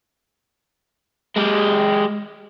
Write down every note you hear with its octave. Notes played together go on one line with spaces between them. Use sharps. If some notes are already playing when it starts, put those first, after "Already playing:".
G#3 G4